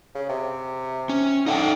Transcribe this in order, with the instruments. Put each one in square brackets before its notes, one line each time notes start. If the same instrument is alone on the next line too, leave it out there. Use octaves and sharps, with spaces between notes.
[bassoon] C#3
C3
[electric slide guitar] C#4
[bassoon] D3 [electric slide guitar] D#4 E5 G5